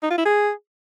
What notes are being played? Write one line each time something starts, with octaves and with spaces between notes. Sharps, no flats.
D#4
F4
E4
G#4